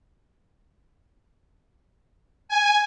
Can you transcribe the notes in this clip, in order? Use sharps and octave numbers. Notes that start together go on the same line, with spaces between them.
G#5